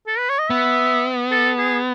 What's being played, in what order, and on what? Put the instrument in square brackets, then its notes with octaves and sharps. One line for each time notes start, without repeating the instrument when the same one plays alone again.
[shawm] A4
B4
C#5
D#5
[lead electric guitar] B3 [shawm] E5
[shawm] A4
G#4